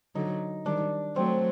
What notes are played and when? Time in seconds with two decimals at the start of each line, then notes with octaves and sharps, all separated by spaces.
0.15 D3 F#3 D#4
0.65 D#3 G3 D4
1.16 F#3 A3 C4